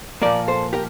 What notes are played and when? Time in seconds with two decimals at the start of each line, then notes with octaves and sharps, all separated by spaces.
0.22 A#2 F3 A#3 A#4 D5
0.48 A4 C5
0.73 G4 A#4